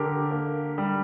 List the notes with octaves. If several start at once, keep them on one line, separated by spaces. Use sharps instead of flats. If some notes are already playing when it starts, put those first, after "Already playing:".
Already playing: D3 G4 A#4
A#3
G3